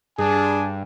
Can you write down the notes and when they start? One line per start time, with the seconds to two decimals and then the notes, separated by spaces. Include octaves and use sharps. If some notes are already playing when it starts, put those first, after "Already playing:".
0.19 G2 D4 G#4 G#5